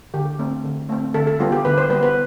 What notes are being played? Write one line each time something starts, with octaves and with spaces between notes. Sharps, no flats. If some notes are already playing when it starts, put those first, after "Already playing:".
D3 G4
A3 C4
D3
A3 C4
D3 A4
A4
G3 B3 F4
G4
D3 B4
C5
G3 B3 B4
B4